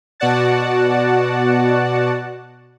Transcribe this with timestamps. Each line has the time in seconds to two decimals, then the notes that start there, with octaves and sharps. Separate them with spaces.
0.20 B2 F#4 D5 F#5 A5